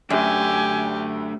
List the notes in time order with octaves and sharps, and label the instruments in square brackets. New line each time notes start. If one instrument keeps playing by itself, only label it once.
[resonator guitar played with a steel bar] F#2 [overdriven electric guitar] A3 D4 [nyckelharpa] G4 [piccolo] G#5